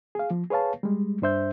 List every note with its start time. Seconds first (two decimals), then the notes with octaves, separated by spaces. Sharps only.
0.15 G#4 F5
0.31 F3
0.50 G#4 B4 C#5 F5 A5
0.83 G3 G#3
1.22 G2 D4 C5 E5 G6